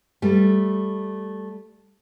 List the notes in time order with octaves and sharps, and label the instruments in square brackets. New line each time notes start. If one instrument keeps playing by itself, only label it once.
[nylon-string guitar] G3 A3